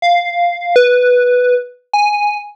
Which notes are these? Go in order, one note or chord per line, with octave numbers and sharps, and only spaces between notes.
F5
B4
G#5